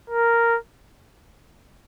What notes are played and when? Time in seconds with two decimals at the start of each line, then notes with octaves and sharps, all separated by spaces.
0.10 A#4